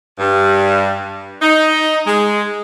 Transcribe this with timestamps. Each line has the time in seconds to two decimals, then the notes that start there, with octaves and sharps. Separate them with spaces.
0.19 G2
1.42 D#4
2.07 G#3